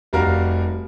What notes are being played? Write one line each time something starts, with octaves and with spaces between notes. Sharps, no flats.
F1 G3 F#4 A#4 F5